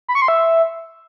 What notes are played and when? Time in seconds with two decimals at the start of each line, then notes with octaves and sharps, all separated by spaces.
0.08 B5
0.15 C#6
0.22 C6
0.28 E5